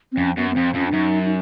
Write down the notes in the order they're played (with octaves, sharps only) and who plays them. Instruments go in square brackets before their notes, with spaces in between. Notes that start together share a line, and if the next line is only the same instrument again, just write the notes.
[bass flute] C4
[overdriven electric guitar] F2 [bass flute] C#4
[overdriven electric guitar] F#2 [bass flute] B3
[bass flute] B3
[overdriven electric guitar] F2 [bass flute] C4
[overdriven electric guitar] F2 [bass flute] C#4
[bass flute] D4
[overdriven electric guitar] F#2 [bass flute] D#4
[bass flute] D#4